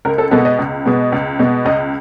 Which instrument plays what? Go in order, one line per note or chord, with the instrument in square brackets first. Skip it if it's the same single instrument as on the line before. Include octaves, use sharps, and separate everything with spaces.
[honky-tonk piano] C#2 A#4
A4
B2 G#3 B3 A4
D#5
C#2
B2 G#3 B3
C#2
B2 G#3 B3
C#2 D#5